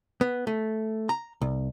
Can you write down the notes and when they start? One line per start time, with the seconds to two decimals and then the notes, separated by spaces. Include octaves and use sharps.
0.21 B3
0.47 A3
1.09 A#5
1.41 C2